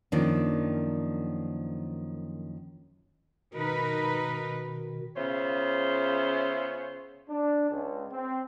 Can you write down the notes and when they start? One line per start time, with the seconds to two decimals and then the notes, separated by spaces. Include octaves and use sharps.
0.12 F#2 D#3 F3 A#3 D4
3.54 B2 D#3 D#4 A#4 B4
5.15 C#3 B3 F4 C5 C#5 E5
7.29 D4
7.71 C#2
8.12 C4